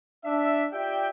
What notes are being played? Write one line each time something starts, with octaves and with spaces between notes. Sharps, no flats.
D4 E5
F4 G4 D5 E5 G5